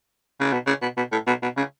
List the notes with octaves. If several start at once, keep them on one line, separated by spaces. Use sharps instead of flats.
C#3
B2
C#3
B2
B2
A2
B2
B2
C#3